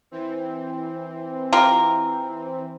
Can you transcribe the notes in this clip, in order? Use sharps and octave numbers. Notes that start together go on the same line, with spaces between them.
E3 C4
F4 G4 A#4